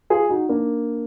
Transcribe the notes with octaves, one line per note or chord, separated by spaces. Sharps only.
F4 G#4
D#4 F#4
A#3 D4